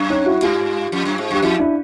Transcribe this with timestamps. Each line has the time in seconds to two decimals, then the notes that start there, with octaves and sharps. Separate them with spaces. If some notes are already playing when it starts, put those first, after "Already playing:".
Already playing: F#2
0.10 C#4 D#4
0.26 E4 F#4
0.42 G2 F4 G4
0.92 F2
1.05 F#2
1.18 G#2
1.31 F#2 G4
1.42 F2 E4 F#4
1.59 D4 E4